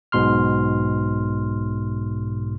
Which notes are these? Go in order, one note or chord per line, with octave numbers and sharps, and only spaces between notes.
B1 G#2 B2 C6 F6